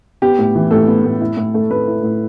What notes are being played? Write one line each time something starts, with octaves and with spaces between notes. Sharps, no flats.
B3 G4
A2
E3
A2 A4
B3
A2
E4
A2
A3
A2 B4
E4
A2